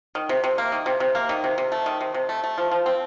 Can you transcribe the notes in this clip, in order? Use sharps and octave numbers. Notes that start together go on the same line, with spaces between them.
D#3
C3
C3
A#3
D#3
C3
C3
A#3
D#3
C3
C3
A3
D#3
C3
C3
A3
A3
F3
F3
C4